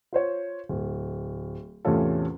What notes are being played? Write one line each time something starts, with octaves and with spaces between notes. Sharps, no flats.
F4 C5 C#5
D1
E2 A2 C3 C#4 F4 A4